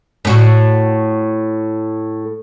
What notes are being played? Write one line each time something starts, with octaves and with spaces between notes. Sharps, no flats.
A2 F#4